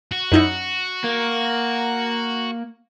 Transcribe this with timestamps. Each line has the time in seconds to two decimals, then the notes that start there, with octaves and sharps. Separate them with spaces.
0.12 F#4
0.32 F#2 D#4 E4
1.04 A#3